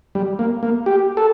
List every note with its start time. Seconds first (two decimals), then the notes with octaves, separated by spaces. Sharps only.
0.15 G3
0.39 A#3
0.63 A#3
0.86 G4
1.17 A4